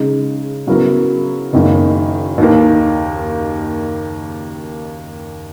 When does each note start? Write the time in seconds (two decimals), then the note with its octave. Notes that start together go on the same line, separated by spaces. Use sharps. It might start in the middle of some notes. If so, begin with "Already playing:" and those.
Already playing: C#3 G#3 D#4
0.67 C#3 F#3 B3 E4 A#4
1.53 F#1 F#2 D#3 A#3
2.38 D#2 D#3 A#3